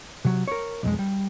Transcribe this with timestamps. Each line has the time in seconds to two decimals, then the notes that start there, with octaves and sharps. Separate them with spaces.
0.25 C3 F#3
0.48 A#4 C#5
0.83 B1 F2 G#3
0.99 G3